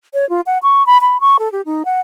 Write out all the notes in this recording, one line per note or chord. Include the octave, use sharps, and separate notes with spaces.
C#5
F4
F#5
C#6
B5
B5
C#6
A4
G4
D#4
F#5